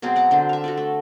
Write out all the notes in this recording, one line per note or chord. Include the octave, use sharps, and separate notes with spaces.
B2 F#3 G#3 C4
F#5 D6
D3 D4 C5
E5 F5
F#4 A4 D5
A3